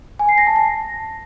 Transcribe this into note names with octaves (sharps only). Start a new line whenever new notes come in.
G#5
C7
A#6
A5
A#6